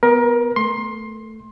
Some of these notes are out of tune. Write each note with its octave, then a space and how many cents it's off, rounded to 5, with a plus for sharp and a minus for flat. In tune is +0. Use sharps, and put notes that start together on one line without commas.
B3 +0 A#4 +25
A3 +0 C6 +20